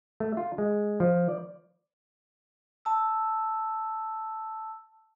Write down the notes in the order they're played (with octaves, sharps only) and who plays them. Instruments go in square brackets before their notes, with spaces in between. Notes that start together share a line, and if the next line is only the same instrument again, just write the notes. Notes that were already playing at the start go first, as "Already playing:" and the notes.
[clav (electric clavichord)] A3
F4
G#3
F3
D5
[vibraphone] A5 E6